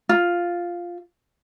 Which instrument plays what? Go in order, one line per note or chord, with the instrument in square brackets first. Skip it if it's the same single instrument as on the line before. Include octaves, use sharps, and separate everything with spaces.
[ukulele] F4